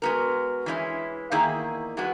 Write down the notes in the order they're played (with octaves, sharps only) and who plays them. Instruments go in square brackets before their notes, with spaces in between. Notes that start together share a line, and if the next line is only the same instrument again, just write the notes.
[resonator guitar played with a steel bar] G#3 B3 F#4 A#4
E3 G#3 C#4 E4
E2 D#3 A#3 E4 G#4
E3 G#3 B3 F#4